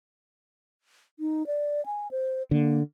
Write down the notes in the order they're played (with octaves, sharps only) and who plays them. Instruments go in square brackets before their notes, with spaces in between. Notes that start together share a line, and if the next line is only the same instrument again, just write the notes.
[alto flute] D#4
D5
G#5
C5
[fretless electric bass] D3 [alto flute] A#3